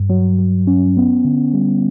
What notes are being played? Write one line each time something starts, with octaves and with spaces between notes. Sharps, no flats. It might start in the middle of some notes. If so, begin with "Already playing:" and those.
Already playing: G2
F#3
F#3
C#4
B3
D3
G3